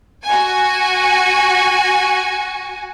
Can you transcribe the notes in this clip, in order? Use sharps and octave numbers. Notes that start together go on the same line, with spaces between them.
F#4 G#5